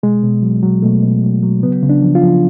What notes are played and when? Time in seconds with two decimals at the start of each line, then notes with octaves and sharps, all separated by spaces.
0.03 B2 G#3
0.23 B2
0.43 F#3
0.63 F#3
0.82 B2 A3
1.03 B2
1.23 F#3
1.43 F#3
1.63 C#3 B3
1.83 C#3
1.89 D4
2.03 F3
2.15 F4
2.22 F3